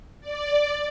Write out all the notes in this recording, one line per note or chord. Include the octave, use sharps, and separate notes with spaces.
D5